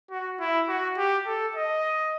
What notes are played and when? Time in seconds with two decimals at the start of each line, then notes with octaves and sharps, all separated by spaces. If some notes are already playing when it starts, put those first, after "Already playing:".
0.10 F#4
0.40 E4
0.68 F#4
0.97 G4
1.26 A4
1.56 D#5